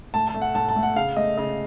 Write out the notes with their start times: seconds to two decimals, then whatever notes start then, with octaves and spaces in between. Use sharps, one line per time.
0.14 A2 A5
0.28 A5
0.34 A3
0.41 F#5
0.54 A2 A5
0.69 A5
0.76 A3
0.83 F#5
0.96 C#3 F5
1.16 A3 D#5
1.37 C#3 D#5